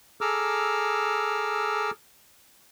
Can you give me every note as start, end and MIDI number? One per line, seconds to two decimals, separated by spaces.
0.21 1.91 68
0.21 1.91 69
0.21 1.91 82
0.21 1.91 86
0.21 1.91 88
0.21 1.91 89